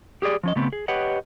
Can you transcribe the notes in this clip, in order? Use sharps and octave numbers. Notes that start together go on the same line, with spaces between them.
G4 G#4 B4 D5
F3 C#4 D#5
C#3 A3 B3 C4
G#4
G4 B4 C#5 D#5 F#5